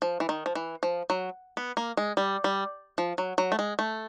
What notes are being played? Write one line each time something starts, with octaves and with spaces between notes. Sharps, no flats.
F3
E3
D#3
F3
E3
F3
F#3
B3
A#3
G#3
G3
G3
F3
F#3
F#3
A3
G#3
A3